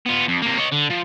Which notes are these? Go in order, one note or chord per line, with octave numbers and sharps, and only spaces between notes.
B3 F4
F2
C3 A#3
C#5 D#5
D3
F3